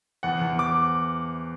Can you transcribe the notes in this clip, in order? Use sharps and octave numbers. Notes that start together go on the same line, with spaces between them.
E2 F#5
E2
D6